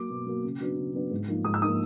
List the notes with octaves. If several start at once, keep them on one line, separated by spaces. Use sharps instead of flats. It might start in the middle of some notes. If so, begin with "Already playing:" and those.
Already playing: F#3 A#3 D6
B2
F#3 A#3
C#3
F#3 B3 D4
C#3
F#3 B3 D4
G#2
F3 A#3 D#4
G#2 D#6
E6
F3 A#3 D#4 D#6